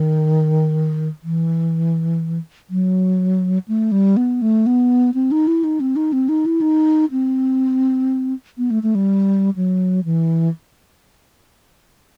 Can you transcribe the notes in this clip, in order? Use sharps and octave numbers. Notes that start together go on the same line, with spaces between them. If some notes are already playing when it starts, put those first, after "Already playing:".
Already playing: D#3
E3
F#3
A3
G3
B3
A3
B3
C4
D#4
E4
D#4
C4
D#4
C4
D#4
E4
D#4
C4
B3
A3
A3
G3
F#3
E3